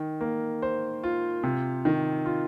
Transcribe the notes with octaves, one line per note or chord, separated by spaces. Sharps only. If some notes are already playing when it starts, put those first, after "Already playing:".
Already playing: D#3
A#3
C5
F4
C3
D#3
F4